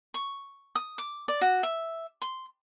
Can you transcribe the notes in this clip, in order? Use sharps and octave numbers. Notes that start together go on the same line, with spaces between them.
C#6
D#6
D6
D5
F#4
E5
C6